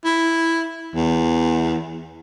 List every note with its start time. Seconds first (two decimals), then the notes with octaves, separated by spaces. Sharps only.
0.05 E4
0.95 E2